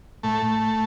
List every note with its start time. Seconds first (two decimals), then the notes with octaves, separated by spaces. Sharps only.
0.23 A2 A3